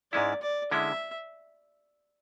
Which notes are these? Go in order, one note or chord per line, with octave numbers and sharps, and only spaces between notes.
G#2 G#3 C#4 E4 D5
D5
D3 G#3 C#4 E4 E5